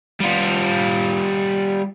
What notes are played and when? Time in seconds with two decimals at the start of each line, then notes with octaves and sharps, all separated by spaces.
0.21 G3 F4